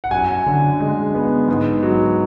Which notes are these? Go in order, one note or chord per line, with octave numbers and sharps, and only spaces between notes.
F#5
F#2 G#5
D3
G#3
B3
G#2
F#3